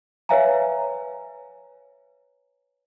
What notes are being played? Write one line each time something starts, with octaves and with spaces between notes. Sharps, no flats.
B4 C#5 E5 F5 G#5 A#5